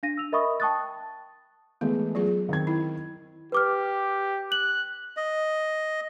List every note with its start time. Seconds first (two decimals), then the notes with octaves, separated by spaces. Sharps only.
0.03 D4 F5 A#6 D#7
0.17 E6 F7
0.32 A#4 D#5 E5 B5 C#6 D#6
0.60 G5 A5 C#6 D#6 F#6 A6
1.81 E3 G#3 A3 B3
2.15 F#3 F4 G#4
2.49 D#3 C4 G#6
2.67 E4
3.52 G4 B4 D6 F6
4.52 F#6 F#7
5.17 D#5